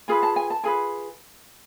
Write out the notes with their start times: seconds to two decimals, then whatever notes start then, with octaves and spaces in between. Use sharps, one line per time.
0.08 F4 G#4 B4 G#5
0.23 A5
0.36 G#5
0.50 A5
0.64 F4 G#4 B4 G#5